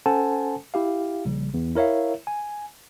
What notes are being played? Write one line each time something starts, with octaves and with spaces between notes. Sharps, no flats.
C#4 A4 C5 F#5 G#5 A5
E4 G4 F5
A#1 C#3 G3
E2
E4 A#4 C#5 E5 F5
G#5